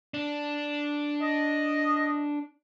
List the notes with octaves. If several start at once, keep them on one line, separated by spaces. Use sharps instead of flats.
D4
D#5